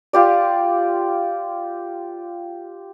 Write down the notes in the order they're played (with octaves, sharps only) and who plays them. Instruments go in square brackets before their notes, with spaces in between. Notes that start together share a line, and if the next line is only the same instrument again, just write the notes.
[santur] F4 G4 D5